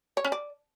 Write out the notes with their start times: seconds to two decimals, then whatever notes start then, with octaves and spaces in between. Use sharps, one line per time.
0.17 C#5
0.25 C#4
0.32 D5